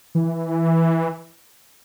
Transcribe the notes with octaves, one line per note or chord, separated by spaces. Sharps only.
E3